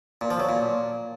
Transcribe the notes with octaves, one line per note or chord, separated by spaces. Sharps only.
A#2
F3
F#3
A#2